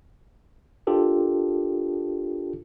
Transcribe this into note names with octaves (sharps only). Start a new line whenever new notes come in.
D4 F4 G4 A4 A#4